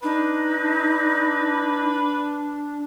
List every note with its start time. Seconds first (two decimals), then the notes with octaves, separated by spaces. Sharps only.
0.03 D4 D#4 B4